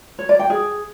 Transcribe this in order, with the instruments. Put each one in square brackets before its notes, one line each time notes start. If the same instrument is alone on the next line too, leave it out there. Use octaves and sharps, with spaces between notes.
[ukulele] C#5
D5
G5
G#4